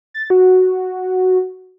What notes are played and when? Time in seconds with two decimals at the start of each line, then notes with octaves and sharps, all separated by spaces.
0.14 A6
0.30 F#4